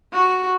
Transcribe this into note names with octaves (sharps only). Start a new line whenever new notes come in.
F#4